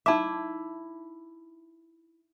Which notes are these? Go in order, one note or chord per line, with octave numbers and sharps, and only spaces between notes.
D#4 E4 E5 A5 D6